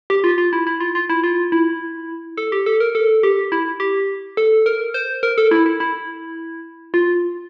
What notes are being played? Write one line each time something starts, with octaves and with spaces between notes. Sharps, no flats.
G4
F4
F4
E4
E4
F4
F4
E4
F4
E4
A4
G4
A4
A#4
A4
G4
E4
G4
A4
A#4
C5
A#4
A4
E4
E4
E4
F4